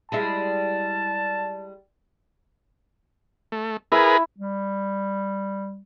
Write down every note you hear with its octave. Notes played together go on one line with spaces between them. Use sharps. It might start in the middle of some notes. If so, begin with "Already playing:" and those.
G3 G#3 E4 A5
A3
E4 G#4 A#4 B4
G3